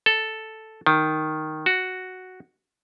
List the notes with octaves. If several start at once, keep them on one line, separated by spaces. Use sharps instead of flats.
A4
D#3
F#4